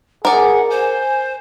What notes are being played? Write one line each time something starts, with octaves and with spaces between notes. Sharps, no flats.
G#4 A#4 D5 F#5
C5 G#5